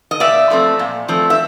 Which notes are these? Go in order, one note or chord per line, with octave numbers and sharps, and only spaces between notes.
D#5
A#2 D5 E5
F3 A3 C4
A#2
F3 A3 C4
E5